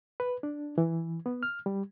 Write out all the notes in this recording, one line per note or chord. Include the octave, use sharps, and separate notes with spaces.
B4
D4
E3
B3
F6
G3